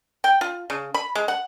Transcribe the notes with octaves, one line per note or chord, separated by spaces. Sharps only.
G5
F4
C#3
B5
G#3
F#5